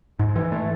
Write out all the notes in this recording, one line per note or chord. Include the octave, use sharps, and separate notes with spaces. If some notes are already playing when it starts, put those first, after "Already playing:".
G#2
E3
A3